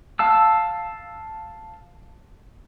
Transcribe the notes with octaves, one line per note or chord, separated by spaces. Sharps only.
F5 A5 E6